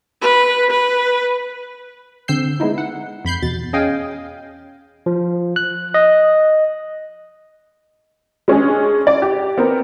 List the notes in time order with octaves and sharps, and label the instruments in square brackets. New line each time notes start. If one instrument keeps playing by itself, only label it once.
[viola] B4
B4
[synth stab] D3 C4 E6 G6 C7
G#3 B3 D#4 E4
F#5
F2 B5 G6 C7
E2 B2 A6
C#4 G#4 D#5 F5 G5 G#5
[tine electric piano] F3
F#6
D#5
[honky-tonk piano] G#3 C#4 D4 G#4
D5
G4
B3 C4 A#4